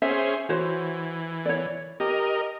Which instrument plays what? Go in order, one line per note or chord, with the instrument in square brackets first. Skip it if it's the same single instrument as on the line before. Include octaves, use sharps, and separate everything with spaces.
[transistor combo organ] C#4 G#4 C5 [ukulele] E5
[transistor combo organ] E3 [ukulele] F#4 C5 C#5
[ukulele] C#5 D5
[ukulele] G4 [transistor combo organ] A#4 D#5